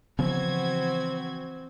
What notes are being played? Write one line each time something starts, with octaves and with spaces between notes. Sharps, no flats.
C#3 E3 F3 B3 C4 F#4 G#6